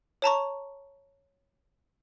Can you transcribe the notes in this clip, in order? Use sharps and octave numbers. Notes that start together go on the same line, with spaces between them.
C#5 A5 A#5 C#6